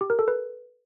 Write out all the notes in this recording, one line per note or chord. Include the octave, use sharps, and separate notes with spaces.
G4
A#4
A4
B4